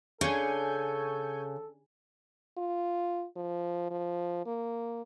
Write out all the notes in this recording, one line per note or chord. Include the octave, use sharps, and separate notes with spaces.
C#3 C#4 D4 A4 G#5 C#6 G6
F4
F3
F3
A#3